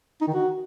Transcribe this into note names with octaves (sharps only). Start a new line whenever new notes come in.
D#4
D#3
F#4